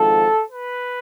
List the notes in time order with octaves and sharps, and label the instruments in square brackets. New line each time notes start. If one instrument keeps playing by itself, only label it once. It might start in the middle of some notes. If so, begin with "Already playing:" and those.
Already playing: [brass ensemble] G#1 G#2 F3 A4
B4